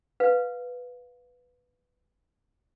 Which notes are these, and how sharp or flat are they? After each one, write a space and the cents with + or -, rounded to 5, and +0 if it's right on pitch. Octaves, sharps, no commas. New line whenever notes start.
B4 +0 F5 +20